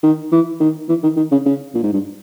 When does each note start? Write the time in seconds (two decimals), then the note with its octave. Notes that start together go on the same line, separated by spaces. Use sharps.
0.03 D#3
0.32 E3
0.60 D#3
0.89 E3
1.03 D#3
1.17 D#3
1.32 C#3
1.46 C#3
1.75 A#2
1.84 G#2
1.93 G2